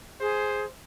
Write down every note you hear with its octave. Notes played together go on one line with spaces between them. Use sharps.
G#4 C5